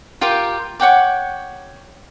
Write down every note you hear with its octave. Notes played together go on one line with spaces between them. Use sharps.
F4 G4 A#4 G5
C#5 F#5 G5 D6